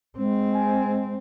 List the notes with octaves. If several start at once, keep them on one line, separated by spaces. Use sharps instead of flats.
G#3 C4
G#5